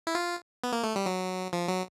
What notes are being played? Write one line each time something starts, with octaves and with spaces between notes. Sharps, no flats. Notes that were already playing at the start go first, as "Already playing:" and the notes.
E4
F4
B3
A#3
A3
G3
F#3
F3
F#3